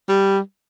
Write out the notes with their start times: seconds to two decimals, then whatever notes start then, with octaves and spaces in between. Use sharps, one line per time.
0.09 G3